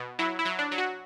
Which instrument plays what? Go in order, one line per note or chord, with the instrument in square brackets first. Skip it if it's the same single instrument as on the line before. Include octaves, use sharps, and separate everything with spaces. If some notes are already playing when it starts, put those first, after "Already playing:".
Already playing: [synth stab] B2
F#3 E4
E4
F#3
D4
F#3
F#4